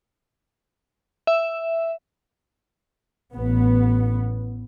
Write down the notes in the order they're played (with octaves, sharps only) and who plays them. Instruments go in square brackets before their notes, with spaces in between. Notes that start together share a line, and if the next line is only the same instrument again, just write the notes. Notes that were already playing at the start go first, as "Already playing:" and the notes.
[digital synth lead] E5
[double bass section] A1 B3